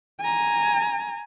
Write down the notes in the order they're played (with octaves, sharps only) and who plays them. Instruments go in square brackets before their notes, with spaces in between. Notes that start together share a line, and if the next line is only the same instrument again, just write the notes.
[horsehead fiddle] G#5 A#5